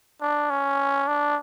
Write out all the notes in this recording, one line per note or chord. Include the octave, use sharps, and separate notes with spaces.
D4
C#4
D4